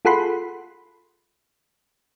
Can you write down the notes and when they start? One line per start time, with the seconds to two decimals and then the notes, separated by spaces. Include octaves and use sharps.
0.05 F4 G#4 A4 F#5 B5 C6